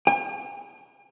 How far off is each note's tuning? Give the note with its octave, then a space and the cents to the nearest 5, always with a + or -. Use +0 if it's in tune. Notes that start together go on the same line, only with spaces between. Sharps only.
G5 +45